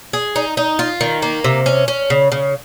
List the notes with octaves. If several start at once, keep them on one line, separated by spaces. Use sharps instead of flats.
G#4
D#4
D#4
F4
D#3
A#3
C3
C#4
C#4
C#3
C#3